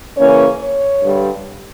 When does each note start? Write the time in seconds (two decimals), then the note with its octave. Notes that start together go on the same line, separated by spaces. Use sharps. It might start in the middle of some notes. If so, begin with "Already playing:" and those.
0.18 C#3 E3 A#3 C#4 C#5
0.59 C#5
1.02 G2 D3 G3